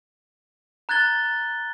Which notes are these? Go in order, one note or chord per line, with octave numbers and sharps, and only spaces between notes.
A#5 F#6 G#6 A6 G7